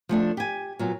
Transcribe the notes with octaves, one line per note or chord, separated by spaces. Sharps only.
F3 A3 D4
G4 G#5
A#2 F#3 B3